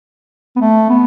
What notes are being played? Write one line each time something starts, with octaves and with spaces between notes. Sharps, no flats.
B3
A3
B3